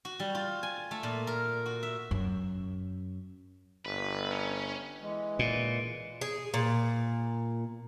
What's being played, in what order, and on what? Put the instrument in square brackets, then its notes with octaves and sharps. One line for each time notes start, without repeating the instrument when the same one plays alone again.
[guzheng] F#4
G3
F4
G#5
A3
A#2
A#4
F#4
E5
[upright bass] F#2
[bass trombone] G1 [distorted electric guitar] B4
[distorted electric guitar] C#4
[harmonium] E3 G#3
[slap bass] A#2
[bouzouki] G#4
A#2